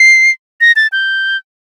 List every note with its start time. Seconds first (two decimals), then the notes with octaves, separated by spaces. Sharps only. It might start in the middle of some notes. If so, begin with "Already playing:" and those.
Already playing: C7
0.61 A#6
0.76 A6
0.92 G6